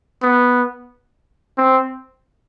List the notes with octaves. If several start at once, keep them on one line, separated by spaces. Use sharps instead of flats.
B3
C4